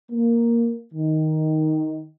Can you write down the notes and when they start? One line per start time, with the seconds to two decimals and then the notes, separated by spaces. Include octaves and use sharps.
0.12 A#3
0.94 D#3